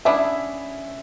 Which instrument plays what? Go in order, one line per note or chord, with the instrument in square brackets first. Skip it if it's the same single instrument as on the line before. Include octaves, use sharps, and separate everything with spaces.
[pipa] B3 D4 G#4 [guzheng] C#4 E4 [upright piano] E5